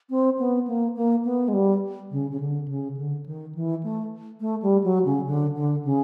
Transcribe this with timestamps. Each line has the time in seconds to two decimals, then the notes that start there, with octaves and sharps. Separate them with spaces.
0.10 C4
0.39 B3
0.67 A#3
0.96 A#3
1.25 B3
1.48 G#3
1.53 G3
2.11 C#3
2.31 C#3
2.40 D3
2.68 C#3
2.97 D3
3.26 D#3
3.55 E3
3.83 A3
4.40 A3
4.62 G3
4.84 F#3
5.05 C#3
5.27 D3
5.55 D3
5.85 C#3